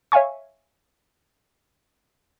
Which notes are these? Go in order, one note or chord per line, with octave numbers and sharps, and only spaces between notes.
C#5 E5 F5 G#5 C#6